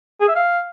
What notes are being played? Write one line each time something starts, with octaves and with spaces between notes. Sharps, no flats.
G#4
E5
F5